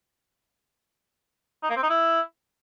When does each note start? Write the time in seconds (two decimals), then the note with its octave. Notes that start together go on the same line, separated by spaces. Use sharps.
1.63 D#4
1.70 A#3
1.76 C4
1.83 D#4
1.89 E4